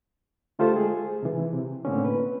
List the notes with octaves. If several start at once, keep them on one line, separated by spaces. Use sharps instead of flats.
D3 A3 F4 G4 A4 C5
G#3 G#4
C3 E3
C3
A2 D3 A#3 C4 C#4
B4